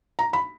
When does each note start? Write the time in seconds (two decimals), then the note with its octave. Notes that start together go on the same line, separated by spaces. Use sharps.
0.19 A#5
0.33 B5